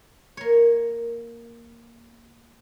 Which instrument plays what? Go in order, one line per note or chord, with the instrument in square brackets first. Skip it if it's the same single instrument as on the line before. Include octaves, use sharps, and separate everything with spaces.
[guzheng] A#3 C#5